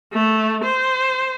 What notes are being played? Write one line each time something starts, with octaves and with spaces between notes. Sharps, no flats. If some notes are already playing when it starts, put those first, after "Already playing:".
A3
C5